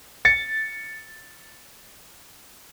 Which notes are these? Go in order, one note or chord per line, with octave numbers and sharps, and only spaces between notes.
A6 C#7